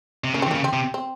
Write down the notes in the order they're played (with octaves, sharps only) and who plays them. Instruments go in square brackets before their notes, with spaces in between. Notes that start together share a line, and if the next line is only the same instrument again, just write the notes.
[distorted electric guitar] C3
[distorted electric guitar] C#3 [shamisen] A#3
[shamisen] C4
[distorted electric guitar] E3
[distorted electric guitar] C#3 [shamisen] A#3
[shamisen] C4
[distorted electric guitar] C3
[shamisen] C4